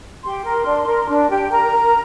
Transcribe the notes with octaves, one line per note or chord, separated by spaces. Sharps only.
G4 C6
A#4
D4
A#4
D4
G4
A#4 A#5
A#4